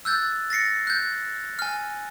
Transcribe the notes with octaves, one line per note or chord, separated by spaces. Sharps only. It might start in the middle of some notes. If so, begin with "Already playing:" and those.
E6 F#6 G6 A6
A6 A#6 C7 C#7
F#6 G6
G#5 F6